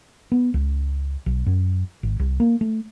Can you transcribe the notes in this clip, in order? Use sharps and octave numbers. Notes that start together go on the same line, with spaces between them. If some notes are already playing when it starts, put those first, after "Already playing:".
B3
C#2
B1
F#2
G#1
C2
A#3
A3